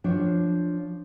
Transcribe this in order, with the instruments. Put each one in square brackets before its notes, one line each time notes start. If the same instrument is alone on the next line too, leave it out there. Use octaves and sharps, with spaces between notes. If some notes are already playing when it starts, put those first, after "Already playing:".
[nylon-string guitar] F3 D4 C#5